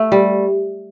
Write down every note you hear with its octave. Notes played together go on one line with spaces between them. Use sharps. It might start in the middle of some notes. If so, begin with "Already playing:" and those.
Already playing: A3
G3